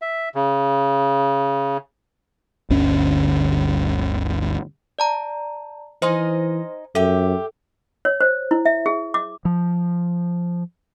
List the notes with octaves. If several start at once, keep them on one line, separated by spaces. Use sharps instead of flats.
E5
C#3
G1 D2 C#4
D5 A5 A#5
E3 D#4 C5 D#5 G#5 C6
F#2 G4 A4 E5
C#5
C5
E4
E5
G#4
D6
F3